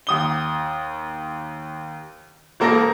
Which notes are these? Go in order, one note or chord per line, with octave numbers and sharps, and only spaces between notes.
D#2 D#6 G7
E1 A#3 A4 A#4 F5 A#6